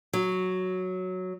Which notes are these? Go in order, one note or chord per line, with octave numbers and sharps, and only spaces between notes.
F#3